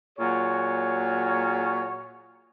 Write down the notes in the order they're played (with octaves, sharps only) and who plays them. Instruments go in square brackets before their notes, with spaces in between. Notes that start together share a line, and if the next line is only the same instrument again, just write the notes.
[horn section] A#2 F#3 F#4 G#4 C#5